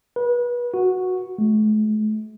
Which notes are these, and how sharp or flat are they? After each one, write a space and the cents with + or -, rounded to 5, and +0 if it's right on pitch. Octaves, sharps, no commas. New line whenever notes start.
B4 -30
F#4 -5
A3 -45